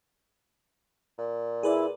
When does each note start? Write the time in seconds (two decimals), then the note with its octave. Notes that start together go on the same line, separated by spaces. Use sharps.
1.18 A#2
1.63 E4 G#4 B4 D5